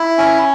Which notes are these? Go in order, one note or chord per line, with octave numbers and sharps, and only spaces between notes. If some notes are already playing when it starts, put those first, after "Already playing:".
Already playing: E4
C#4